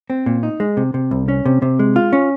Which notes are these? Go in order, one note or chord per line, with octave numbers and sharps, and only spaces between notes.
C4
A#2
D#4
G#3
C3
C3
C2
C#4
C3
C3
G#3
F4
C#4